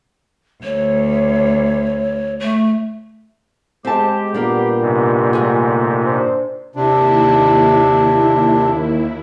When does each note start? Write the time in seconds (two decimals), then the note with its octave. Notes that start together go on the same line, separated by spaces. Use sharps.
0.64 D2 C#5
2.40 A3
3.85 G#3 C4 G4 A5
4.34 A#2 G3 A#3 B3 D4
4.82 G#2 C3
5.33 D2 G#4
6.03 D4 C5
6.76 D#2 C3 D4 E4